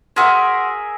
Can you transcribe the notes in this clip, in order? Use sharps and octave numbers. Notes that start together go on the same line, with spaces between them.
F#4 G#4 A#4 C5 E5